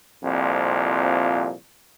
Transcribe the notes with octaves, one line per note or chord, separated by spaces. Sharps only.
C2 F2 A#2